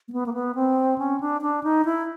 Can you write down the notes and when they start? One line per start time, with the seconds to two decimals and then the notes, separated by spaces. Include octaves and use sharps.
0.08 A#3
0.12 B3
0.26 A#3
0.34 B3
0.55 C4
0.98 C#4
1.20 D4
1.41 D4
1.63 D#4
1.85 E4